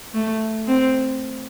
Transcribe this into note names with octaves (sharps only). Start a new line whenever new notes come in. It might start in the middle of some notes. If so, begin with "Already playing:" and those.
A3
C4